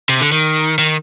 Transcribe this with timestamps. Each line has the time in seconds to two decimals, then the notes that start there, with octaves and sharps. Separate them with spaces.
0.09 C3
0.21 D3
0.32 D#3
0.78 D#3